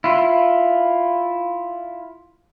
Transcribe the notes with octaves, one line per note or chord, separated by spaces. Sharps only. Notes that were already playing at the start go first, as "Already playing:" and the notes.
E4 F4